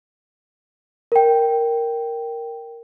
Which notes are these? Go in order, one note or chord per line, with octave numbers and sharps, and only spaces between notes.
A#4 G5